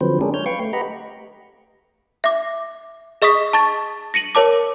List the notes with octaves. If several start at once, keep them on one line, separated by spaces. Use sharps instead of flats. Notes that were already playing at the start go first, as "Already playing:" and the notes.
D3 F3 F#3 C4 B4 C5
G#3 C#4 D4 G4 G#4 A#4
C#5 F6 G6
B4 F5 G5 C#6
A3
G4 B4 D#5 F#5 A#5 B5
E5 D6
G#4 D#5 C#6 D#6 B6
A5 C#6 A6
A#6 C#7 D#7 F#7
A#4 C#5 A5 D6